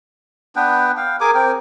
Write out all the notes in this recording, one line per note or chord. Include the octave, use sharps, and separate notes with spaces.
B3 D4 B4 G5
F5 G5
G#4 A#4 G#5 D6
C4 A#4 G5